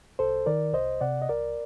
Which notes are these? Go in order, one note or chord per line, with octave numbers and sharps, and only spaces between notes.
C2 A4 C5
D#3 A#4 D5
C2 C5 D#5
C3 D5 F#5
D#5
C2 A#4 D5